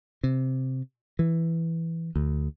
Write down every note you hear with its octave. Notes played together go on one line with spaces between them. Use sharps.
C3
E3
D2